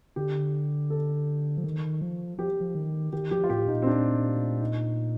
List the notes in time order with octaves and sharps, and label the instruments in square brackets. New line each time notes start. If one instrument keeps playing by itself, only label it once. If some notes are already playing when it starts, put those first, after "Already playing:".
[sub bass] D3 [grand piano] G4
[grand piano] A4
[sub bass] F3
D#3
F3
[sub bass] F3 [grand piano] G4
[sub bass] F3
D#3
[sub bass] D#3 [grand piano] G4
[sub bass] F3 [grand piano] G4
[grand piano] F4
[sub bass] A2 [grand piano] G4
[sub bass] A#2 [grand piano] D#4
[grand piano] C4
D4
D#4